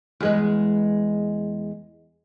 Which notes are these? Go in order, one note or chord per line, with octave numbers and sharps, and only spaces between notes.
E2 G#3 B4